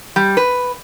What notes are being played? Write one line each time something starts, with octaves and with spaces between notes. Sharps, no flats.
G3
B4